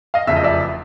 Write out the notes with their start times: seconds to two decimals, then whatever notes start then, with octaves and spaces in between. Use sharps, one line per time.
0.14 D#5 F5
0.27 F1 E2 C#3 F3 E5
0.36 D#5
0.44 D5 E5